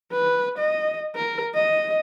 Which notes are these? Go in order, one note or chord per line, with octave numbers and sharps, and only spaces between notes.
B4
D#5
A#4
D#5